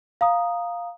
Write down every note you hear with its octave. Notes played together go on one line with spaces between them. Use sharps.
F5 A#5 D#6